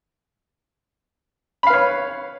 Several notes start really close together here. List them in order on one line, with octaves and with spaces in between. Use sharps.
B5 F5 B4 C#5